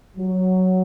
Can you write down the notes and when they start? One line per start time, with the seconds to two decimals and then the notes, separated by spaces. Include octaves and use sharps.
0.17 F#3